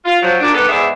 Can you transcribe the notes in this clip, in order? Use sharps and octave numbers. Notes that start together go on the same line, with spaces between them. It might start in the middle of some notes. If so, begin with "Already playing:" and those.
F4
F3 F#3
A#2 D4
D#3 B3 G4 A4 B4
E2 G#2 G#4 D5 E5